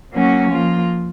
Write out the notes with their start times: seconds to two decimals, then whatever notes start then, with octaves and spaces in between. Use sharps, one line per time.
0.14 F#3 A#3 C#4 F#4
0.51 F3 A#3 F4